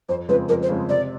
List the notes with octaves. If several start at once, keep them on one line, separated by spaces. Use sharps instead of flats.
F2 C5
C#3 F3 G#3 C4 B4
F2 A#4
C5
C#3 F3 G#3 C4
C3 D5